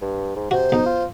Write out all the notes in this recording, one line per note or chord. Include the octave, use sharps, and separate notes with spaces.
G2
G#2
C3 F#4 C5
B1 D#4
F4